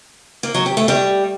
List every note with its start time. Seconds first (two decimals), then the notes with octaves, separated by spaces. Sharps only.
0.43 A#3
0.54 F#3
0.66 G4
0.77 A3
0.88 G3